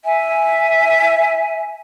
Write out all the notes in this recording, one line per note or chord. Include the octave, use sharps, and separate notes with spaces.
E5 G#5